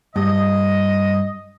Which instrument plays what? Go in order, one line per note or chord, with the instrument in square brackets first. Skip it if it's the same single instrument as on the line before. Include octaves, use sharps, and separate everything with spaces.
[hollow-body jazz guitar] G2 [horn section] D#5